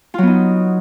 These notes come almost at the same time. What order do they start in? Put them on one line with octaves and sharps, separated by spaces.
F4 F#3 B3 D#4